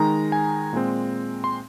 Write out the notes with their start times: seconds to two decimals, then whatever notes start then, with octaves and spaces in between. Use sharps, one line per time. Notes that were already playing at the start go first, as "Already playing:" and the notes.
Already playing: D#3 G#3 D#4 A#5
0.32 G#5
0.73 A#2 G#3 C4
1.44 C6